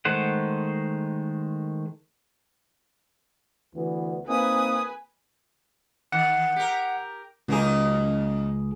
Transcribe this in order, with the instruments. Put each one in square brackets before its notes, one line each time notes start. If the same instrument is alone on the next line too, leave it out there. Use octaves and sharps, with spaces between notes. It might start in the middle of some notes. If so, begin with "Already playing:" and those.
[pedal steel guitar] D#3 G#3 A3 C5 F#5
[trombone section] D2 E3 B3
[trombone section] A#3 C4 D#4 [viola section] B4 G#5 [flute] D#6
[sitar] D#3 [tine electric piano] F#5
[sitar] G4 A#4
[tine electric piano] C#2 G#4 [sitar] F#2 A#3 D#4